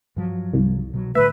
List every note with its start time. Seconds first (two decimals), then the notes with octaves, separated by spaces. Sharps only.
0.16 G2 F3 F#3
0.53 C2
0.94 B2 F#3
1.15 A2 D3 A3 B4 E5